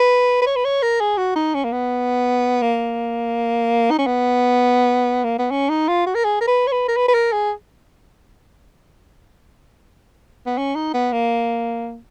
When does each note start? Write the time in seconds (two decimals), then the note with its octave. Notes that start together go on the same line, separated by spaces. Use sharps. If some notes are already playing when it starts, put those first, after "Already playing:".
Already playing: B4
0.42 B4
0.46 C#5
0.56 B4
0.64 C#5
0.83 A#4
1.01 G#4
1.18 F#4
1.36 D#4
1.54 C#4
1.65 A#3
1.72 B3
2.62 A#3
3.91 D#4
3.98 C#4
4.07 B3
5.25 A#3
5.39 B3
5.51 C#4
5.69 D#4
5.88 F4
6.06 F#4
6.15 A#4
6.25 G#4
6.41 A#4
6.48 B4
6.67 C#5
6.72 B4
6.88 A#4
6.97 B4
7.09 B4
7.14 A#4
7.32 G#4
10.46 B3
10.58 C#4
10.75 D#4
10.94 B3
11.13 A#3